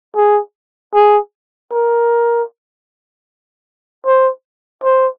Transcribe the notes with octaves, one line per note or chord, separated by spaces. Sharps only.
G#4
G#4
A#4
C5
C5